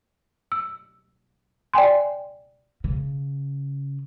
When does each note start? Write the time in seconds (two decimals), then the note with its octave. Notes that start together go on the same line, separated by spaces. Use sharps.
0.52 E6
1.74 D5 G5 G#5 C6
2.84 C#3